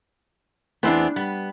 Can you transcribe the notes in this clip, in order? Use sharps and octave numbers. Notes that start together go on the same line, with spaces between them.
E2 B3 C4 D4 C5
G3 B3